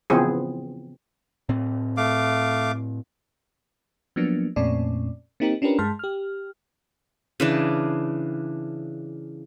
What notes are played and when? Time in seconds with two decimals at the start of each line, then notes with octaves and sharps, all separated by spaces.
0.10 C#3 E3 F3 B3 C4 G#4
1.49 A2 C4
1.97 A3 F5 D6
4.16 F3 F#3 A#3 B3 D4
4.56 F2 A#2 A3 C4 C#4 D5
5.40 A#3 C4 D#4 G4 A#4
5.62 C#4 D4 F4 G4 A#4 B4
5.79 G2 G#3 A5 C6 F6
5.99 G4 F6
7.40 C#3 E3 D4